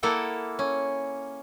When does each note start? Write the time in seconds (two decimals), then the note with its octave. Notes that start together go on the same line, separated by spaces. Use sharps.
0.03 A#3 E4 A4 F#5 G5
0.59 C#4